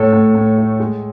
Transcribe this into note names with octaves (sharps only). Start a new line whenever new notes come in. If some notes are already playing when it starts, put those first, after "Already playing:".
Already playing: A2 A4 C#5
A2
A2
A3
G#3